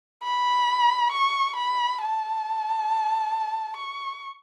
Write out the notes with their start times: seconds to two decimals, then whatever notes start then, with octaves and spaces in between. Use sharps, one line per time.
0.23 B5
1.12 C#6
1.56 B5
2.01 A5
3.77 C#6